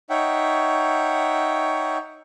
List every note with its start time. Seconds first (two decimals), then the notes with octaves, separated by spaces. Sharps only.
0.10 D#4 C#5 E5 F#5 G5